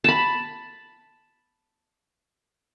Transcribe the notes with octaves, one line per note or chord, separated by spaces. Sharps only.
A5 B5